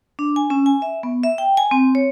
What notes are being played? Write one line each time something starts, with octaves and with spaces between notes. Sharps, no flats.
D4
G#5
C#4
G#5
E5
B3
E5
G5
G#5
C4
C#5